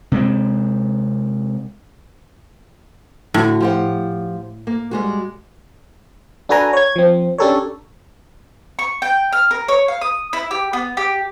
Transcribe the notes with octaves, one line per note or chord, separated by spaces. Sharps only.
C3 G#3 C4
A2 D3 F#4
F3 G4 F#5
A#3
G3 G#3 F#4
D4 F#4 A4 B4 G#5 A#5
C#5 G#6
F3 C4
C#4 D4 G4 A4 A#4 C#5
C#6
G5
F6
A#4
C#5
F5
D#6
E4
G4
B3
G4